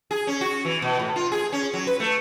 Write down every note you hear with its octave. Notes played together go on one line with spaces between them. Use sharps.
G#4
C#4
F#4
E3
B2
A2
F4
G#4
C#4
F#3
B4
A3